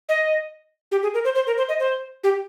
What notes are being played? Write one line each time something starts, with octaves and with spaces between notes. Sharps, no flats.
D#5
G4
G#4
A#4
C5
C5
A#4
C5
D#5
C5
G4